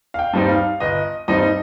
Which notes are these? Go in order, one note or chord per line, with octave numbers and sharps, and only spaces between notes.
F5
G5
G2 G3 C4 D#4
F5
G1 D#5
G2 G3 C4 D#4 D#5